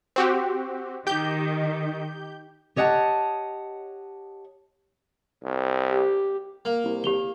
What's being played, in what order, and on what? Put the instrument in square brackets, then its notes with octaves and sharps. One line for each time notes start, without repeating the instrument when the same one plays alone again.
[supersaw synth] C4 F#4 G4
[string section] D#3 [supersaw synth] G4 G6
[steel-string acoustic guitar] G4 C#5 D#5 F#5 G#5 A5
[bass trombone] C2
[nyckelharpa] G4
[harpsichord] A#3
[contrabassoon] C2
[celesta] G4 F7 G7